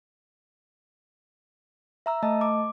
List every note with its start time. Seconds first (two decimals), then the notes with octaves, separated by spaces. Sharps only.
2.06 E5 A#5 E6
2.23 A3 D#5 A5
2.41 D6